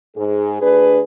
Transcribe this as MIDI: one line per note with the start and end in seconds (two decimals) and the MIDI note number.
0.16 0.58 44
0.16 0.58 68
0.61 1.01 38
0.61 1.01 62
0.61 1.01 68
0.61 1.01 71